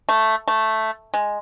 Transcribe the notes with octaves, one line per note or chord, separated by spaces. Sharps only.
A3
A3
G#3